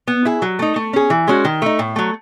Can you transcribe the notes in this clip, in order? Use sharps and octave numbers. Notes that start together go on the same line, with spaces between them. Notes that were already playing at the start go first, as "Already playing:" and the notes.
B3
E4 G#4
F#3
A3 D#4
A3
C#4 G#4
E3
G#3 C#4 F#4
D#3
A3 D#4
A2
F#3 A3